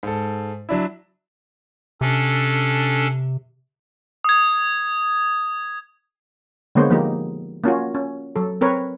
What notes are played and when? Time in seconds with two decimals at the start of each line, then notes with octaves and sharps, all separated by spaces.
0.03 G#2 A4
0.69 F#3 D4 E4
2.01 C3 C#4 D4 A4
4.24 D#6 G#6
6.75 D3 G#3 A#3 B3 C5 C#5
6.90 F3 A#3 D#4 G4
7.64 A#3 C#4 F4 F#4
7.95 C#4
8.36 F#3 A4
8.61 C4 A#4 B4 C#5